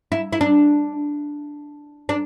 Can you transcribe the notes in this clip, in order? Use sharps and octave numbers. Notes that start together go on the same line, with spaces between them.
E4
E4
D4
D4